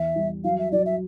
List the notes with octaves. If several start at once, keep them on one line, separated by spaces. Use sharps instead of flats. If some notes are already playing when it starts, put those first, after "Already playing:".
Already playing: E2 E5
G3
F#3 F5
E5
F#3 D5
E5